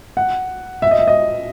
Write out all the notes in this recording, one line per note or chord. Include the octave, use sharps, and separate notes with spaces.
F#5
E5
D#5
E5
D#5